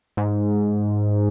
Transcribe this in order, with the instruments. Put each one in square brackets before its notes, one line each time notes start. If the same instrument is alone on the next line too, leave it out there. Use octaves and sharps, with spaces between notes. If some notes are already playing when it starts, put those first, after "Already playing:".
[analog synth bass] G#2